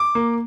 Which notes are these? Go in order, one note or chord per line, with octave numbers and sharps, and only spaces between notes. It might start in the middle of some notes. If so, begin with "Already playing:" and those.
Already playing: D6
A#3